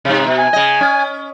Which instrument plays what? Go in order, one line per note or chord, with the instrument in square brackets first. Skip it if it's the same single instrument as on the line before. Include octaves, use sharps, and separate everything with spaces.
[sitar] G#2 C3
B2
[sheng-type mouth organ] G#5
[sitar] C#3 D#5
C#4